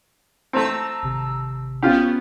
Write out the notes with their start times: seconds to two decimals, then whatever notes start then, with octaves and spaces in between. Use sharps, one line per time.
0.53 A3 C4 A5 A#5 E6
1.03 G#1 C3
1.82 B3 C#4 F4 G4